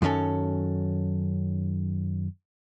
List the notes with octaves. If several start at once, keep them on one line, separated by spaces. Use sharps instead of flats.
F#2 D#3 F#3 C#4 A4